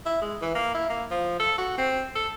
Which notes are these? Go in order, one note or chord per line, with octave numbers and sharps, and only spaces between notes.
E4
G#3
E3
A#3
E4
A#3
F3
A4
F#4
C4
A4